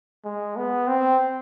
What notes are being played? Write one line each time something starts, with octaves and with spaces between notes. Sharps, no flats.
G#3
B3
C4